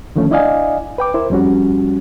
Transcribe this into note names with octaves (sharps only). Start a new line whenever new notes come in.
D3 D#3 F3 A3 C#4
D4 E4 D5 D#5 F5 G#5
B4 G5 D6
E4 A#4 C5
F2 G3 C#4 F#4